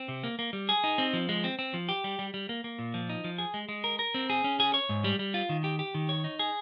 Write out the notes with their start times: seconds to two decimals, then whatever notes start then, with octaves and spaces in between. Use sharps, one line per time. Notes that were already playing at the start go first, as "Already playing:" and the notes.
Already playing: C4
0.08 C3
0.24 A#3
0.39 A#3
0.53 G3
0.69 G#4
0.84 D#4
0.98 C4
1.13 F3
1.29 G#3
1.44 C4
1.59 C4
1.74 F3
1.89 G4
2.04 G3
2.19 G3
2.34 G3
2.49 A#3
2.64 A#3
2.79 A#2
2.94 F3
3.09 D#4
3.24 F3
3.38 G#4
3.54 G#3
3.69 G#3
3.84 A#4
3.99 A#4
4.15 C4
4.30 G#4
4.44 C#4
4.60 G#4
4.74 C#5
4.89 G#2
5.04 G3
5.19 G3
5.34 F4
5.49 D#3
5.64 G4
5.79 G4
5.95 D#3
6.09 C#5
6.24 D#4
6.39 G#4